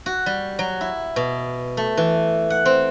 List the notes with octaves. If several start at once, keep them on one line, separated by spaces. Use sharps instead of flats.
F#4
G3
F#3
E4
B2
A3
E3
F#5
C4